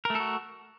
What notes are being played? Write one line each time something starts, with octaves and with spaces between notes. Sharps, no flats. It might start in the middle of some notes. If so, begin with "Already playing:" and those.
A3 F#4 A4 A#4